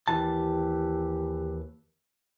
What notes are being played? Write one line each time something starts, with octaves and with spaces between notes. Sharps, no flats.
D#2 E3 G4 A5